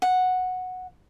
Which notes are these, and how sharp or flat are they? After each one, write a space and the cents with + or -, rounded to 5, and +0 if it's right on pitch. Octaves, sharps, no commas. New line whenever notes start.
F#5 -10